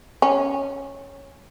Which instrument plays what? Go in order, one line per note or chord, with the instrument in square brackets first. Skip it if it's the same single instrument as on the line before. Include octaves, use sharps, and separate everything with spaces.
[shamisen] C#4